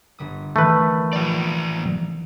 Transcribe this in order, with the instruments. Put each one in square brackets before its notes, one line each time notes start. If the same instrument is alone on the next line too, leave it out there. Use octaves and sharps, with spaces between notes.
[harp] G1 G3 D#6
[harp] D#3 E3 [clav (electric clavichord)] A3 B4
[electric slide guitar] F3 D5